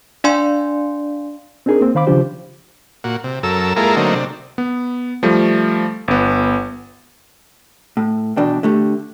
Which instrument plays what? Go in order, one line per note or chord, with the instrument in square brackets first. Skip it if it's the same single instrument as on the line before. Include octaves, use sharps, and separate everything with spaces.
[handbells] D4 D5 F5 G#5 C6
[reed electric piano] C4 D4 D#4 G#4 A#4
A#3 C4
D#3 C5 F5 B5 D6
C#3 F3 D4 F4 G4 C5
[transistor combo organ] A#2 F#4
C3
F#2 A4 A#4 E6
G#3 A#3 E4 F4 A4 A#4
D3 F#3 A3 A#3 C4 D#4
C3 D4
[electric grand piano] B3
F3 G3 A3
G1 B3
[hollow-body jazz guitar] A2
E2 B2 D4 G5
D3 A3 G4